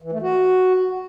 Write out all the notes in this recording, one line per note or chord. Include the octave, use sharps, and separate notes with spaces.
E3
A3
F#4